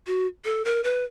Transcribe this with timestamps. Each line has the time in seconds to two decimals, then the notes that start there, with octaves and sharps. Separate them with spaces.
0.07 F#4
0.45 A4
0.65 A#4
0.84 B4